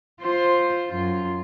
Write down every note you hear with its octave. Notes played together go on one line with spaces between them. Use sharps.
F4 C5
F#2 F4